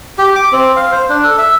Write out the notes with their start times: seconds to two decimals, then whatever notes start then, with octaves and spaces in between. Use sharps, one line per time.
0.18 G4
0.35 D6
0.52 C4
0.76 F5
0.92 C5
1.09 D4
1.24 A4
1.38 E5